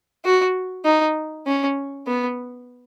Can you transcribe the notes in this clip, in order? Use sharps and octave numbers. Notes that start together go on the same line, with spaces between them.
F#4
D#4
C#4
B3